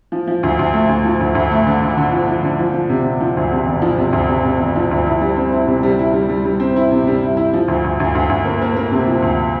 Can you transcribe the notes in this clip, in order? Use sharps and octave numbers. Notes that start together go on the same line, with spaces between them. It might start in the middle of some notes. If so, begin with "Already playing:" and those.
F3
F3
D2
D2
A3
D2
F3
D2
D2
A3
D3
D3
D3
F3
F3
D3
F3
F3
C3
C3
F3
D2
C3
E1
F3
C3
D2
C3
C3
E1
F3
D2
E4
G3
C4
E4
C3
G3
E4
G3
G3
G3
C4
E4
C3
G3
E4
E4
F3
D2
D2
D2
D2
D2
A#3
A#3
A#3
C3
F3
D2